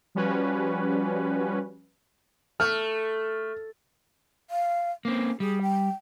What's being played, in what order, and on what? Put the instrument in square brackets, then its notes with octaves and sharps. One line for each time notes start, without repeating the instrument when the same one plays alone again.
[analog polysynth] F3 G3 C#4 F#4 B4
[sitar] A3 [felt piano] F6
[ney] F5
[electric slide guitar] A#3 C4 [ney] C#4
[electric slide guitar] G3 [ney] G#4
[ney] G5